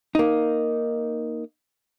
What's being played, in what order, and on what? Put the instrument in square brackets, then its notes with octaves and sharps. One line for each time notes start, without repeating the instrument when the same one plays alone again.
[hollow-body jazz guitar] A#3 D#4